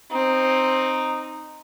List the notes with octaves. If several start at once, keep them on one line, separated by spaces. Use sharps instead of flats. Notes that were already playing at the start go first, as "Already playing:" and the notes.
C4 D#4